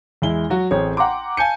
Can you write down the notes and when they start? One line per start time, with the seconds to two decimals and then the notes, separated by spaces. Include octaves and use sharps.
0.22 E2 G#3 E4 G7
0.50 F#3 F#4
0.71 A1 C4 G#4 C#5
0.97 F#5 G5 A#5 C6 D6
1.37 F5 G#5 A5 G6 C#7